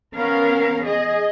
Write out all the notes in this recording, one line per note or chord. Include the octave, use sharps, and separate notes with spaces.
B3 C#4 A#4 F5
G#4 D#5